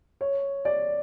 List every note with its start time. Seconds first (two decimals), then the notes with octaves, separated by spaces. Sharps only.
0.21 C#5
0.65 D5